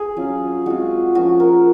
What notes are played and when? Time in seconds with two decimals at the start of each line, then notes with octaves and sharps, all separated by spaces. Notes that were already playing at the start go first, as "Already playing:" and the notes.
Already playing: G#4
0.17 F#3 C#4 F4
0.66 G#3 C4 F4 F#4
1.15 F3 A#3 C#4 F4 F#4
1.40 A#4